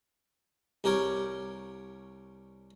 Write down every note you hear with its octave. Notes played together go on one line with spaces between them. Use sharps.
C2 G4 A#4 C#5 G5